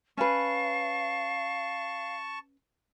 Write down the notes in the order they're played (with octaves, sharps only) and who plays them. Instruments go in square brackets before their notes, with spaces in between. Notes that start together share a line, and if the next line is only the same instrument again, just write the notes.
[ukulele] C#4 B4 [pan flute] F5 [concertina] A5 C#6